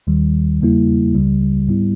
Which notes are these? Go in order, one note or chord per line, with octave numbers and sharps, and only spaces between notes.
D#2 D#3 G3
E2 C#3 G3 A#3 E4
C#2 C#3 G3
G#2 G3 B3 E4